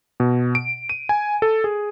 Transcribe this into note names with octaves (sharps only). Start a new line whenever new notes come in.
B2
D7
D#7
G#5
A4
G#4